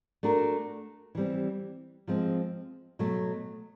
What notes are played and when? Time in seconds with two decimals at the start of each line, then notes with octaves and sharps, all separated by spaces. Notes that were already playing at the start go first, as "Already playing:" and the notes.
0.23 A3 D4 F#4 A#4
1.15 E3 G3 C4
2.07 F3 G#3 C4
2.99 B2 F#3 A3